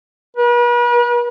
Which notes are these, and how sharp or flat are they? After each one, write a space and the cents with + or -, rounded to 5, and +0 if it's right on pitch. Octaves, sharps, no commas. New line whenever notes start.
B4 -40